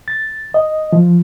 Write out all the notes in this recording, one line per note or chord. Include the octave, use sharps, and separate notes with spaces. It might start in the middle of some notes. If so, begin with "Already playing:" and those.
A6
D#5
F3